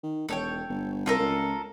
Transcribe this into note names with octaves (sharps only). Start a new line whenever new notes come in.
D#3
E1 A4 C#5 G5
G1
C2 F4 A4 A#4
C#2